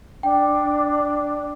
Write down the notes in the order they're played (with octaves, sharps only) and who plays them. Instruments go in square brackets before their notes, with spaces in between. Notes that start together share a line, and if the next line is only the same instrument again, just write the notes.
[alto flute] D4 [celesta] G5